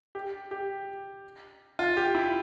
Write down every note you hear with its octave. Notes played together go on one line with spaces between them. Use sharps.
G4
G4
F4
G4
E4